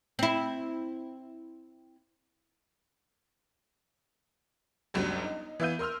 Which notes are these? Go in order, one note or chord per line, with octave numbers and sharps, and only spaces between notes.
C4 E4
G1 C#2 F#3 G3
D#4
E3 B3 E5 F5 G6 D#7
A#4 C6 E6 F6